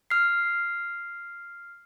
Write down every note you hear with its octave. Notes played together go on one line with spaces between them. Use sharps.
F6 C7